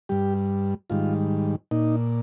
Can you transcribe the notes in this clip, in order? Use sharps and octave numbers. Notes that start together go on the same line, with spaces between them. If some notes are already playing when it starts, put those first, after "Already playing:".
G2 G3 G4
G#2 D#3 G3 F4
A#2 D#4